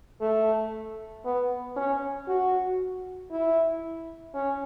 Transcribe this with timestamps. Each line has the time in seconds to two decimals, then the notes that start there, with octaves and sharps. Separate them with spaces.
0.21 A3
1.25 B3
1.76 C#4
2.28 F#4
3.31 E4
4.34 C#4